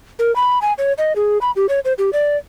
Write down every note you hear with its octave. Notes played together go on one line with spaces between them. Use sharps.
A#4
B5
G#5
C#5
D#5
G#4
B5
G4
C#5
C5
G4
D5